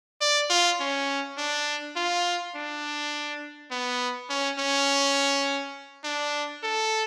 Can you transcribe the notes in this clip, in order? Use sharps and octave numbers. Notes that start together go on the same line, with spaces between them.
D5
F4
C#4
D4
F4
D4
B3
C#4
C#4
D4
A4